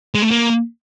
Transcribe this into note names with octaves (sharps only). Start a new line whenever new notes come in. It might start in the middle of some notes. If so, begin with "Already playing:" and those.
G#3
A3
A#3